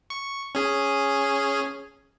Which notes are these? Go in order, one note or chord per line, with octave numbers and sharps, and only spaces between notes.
C#6
C#4 G#4